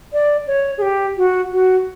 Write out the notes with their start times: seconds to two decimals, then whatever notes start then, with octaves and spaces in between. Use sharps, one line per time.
0.13 D5
0.47 C#5
0.78 G#4
0.82 G4
1.17 F#4
1.52 F#4